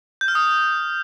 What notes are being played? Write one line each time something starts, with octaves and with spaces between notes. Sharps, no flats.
G6
F6
D#6